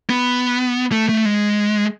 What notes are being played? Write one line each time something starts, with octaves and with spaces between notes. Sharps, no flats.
B3
A3
A3
G#3